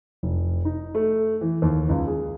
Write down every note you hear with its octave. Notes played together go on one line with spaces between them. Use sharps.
F1
D#4
A3
E3
D#2
C#2
G#4